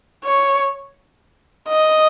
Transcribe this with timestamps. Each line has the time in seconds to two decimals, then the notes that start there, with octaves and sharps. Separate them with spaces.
0.24 C#5
1.69 D#5